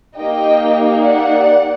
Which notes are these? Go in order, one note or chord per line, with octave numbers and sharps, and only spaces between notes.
A#3 D#4 G4 D#5 G5
D5 F#5